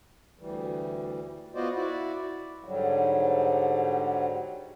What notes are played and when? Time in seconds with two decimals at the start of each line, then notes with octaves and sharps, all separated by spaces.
0.39 D2 E3 G3
1.55 B3 F4 F#4 C5 D5 D#5
1.75 E4 F#4 D5
2.64 G#2 D3 F#3 G3